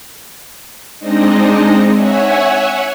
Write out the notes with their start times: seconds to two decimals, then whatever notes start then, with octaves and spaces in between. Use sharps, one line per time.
0.99 G#3 C4 D4 D#4 D#5
1.95 C#5 E5 F#5 G#5